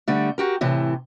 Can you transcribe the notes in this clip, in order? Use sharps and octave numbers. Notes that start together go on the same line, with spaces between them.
D3 G3 A3
F#4 G4 A#4
A2 C3 E3